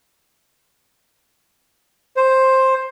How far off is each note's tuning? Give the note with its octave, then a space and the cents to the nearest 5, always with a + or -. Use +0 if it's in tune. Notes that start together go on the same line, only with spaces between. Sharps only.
C5 +10